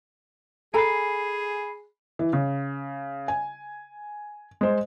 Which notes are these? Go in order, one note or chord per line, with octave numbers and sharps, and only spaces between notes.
G#4 A4 G#5 A#5 B5 C7
E3
C#3
G#5
G#3 C5